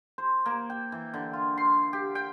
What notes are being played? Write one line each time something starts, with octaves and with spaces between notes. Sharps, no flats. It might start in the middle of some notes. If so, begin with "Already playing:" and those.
C5
A#3
G5
E3
D3
F4
C6
G4
G5